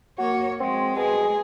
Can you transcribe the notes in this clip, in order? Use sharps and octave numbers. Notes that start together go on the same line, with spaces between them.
A#3 F#4 C#5
G#3 C4
B2 G#4